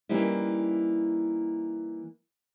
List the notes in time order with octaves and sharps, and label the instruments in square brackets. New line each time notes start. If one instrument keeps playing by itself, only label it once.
[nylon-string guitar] E3 G3 A#3 C#4 D#4 E4